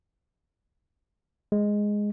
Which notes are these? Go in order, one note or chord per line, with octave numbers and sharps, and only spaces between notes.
G#3